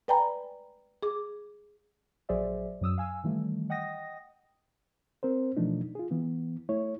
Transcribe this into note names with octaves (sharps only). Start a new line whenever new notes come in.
B4 D5 G5 G#5 A#5 B5
G#4 D6
A#1 F#3 G#4 C5 D5 E5
F#2 F#3 D#6 E6
F5 G#5 E6
D#3 E3 G3 A3
D#5 F#5 G5 D#6 A#6
C4 A#4 C5
B2 E3 F3 A3 D4 D#4
F4 G#4
E3 B3
A3 E4 C#5